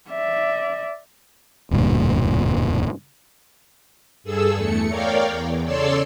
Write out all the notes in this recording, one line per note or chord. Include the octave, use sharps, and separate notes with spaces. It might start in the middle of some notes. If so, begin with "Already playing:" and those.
D5 E5
E1 D2 G2 A#2
G2 G#4 A4 E6
E2 A3 C#7
A#4 C#5 D5 F5 G5
E2
C#3 A4 C#5 D5 C6 E6